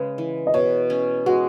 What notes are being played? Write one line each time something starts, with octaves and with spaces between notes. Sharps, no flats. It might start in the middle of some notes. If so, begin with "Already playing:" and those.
Already playing: C#3 G#3 B4
E3
D#5
B2 C#5
C#4
G#3 F#4